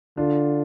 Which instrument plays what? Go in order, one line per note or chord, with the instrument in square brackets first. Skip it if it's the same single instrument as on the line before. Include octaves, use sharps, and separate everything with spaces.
[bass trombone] D3 [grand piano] D4 F4